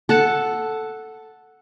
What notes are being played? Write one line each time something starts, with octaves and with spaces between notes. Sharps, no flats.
A4 F#5 A5